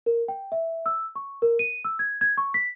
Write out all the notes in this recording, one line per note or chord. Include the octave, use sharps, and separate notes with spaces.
A#4
G5
E5
E6
C#6
A#4
D#7
E6
G#6
G#6
C#6
B6